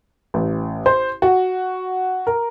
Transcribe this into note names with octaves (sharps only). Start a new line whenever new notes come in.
A1
C5
F#4
A#4